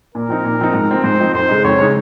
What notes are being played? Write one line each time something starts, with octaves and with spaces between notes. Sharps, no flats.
A#2 A#4
F3 C4 D#4
A#2
F3 C4 D#4
G#2
F3 C4 D#4
G#2 C5
F3 C4 D#4
F2 C5
C#3 G#3 D#4
F2 C#5
C#3 G#3 D#4